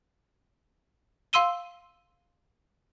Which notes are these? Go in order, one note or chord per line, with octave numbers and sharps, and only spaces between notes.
F5 C6 E6 D#7 G7